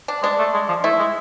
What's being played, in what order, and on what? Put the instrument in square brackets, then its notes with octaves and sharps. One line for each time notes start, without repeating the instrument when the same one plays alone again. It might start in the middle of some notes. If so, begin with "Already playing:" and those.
[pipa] D4
[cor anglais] G#3 [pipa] D4
[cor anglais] A3
G#3
F3
[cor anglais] A3 [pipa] E4
[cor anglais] G#3